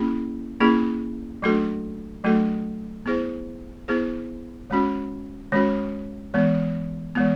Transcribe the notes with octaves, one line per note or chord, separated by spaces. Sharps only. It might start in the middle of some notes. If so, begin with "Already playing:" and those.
Already playing: A#3 C#4 E4 G#4
A#3 C#4 E4 G#4
F#3 A3 D4 F#4 A4
F#3 A3 D4 F#4 A4
B3 E4 G#4 C5
B3 E4 G#4 C5
D#3 G#3 C#4 F#4
D#3 G#3 C#4 F#4
E3 G#3 B3
E3 G#3 B3